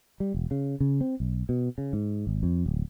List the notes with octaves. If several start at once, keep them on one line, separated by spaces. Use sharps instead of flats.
G3
E1
C#3
C#3
C4
B1
B2
C#3
G#2
G#1
F2
D1